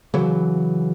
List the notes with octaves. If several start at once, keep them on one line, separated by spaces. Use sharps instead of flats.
C#3 E3 F#3